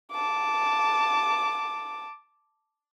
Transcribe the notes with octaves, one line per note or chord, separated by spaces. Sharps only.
A5 D6